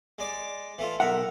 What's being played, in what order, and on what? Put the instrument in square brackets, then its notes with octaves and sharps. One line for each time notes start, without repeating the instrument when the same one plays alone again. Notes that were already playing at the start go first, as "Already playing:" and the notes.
[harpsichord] G#3 D5 D6
E3 A3 F4
[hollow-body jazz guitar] B1 F#5 [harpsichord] A#4 E5